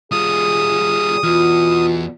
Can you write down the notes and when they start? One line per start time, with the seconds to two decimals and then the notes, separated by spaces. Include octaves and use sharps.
0.12 G3 F4 G#4 D#6
1.23 E2 B2 F4